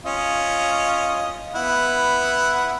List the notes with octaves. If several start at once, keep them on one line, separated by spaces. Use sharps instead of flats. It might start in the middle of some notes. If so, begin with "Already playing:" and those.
C#4 F4 D#5
B3 E4 F#5